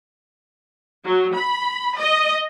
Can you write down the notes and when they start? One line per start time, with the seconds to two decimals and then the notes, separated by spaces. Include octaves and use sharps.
1.05 F#3
1.35 B5
1.98 D#5